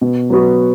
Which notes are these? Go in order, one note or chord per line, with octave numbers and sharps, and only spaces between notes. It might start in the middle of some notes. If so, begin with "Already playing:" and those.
B2
F#3 B3 F#4